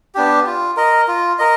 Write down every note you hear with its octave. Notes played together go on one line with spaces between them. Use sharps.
B3 D4 G4
F4
A#4 D#5
F4
A#4 D#5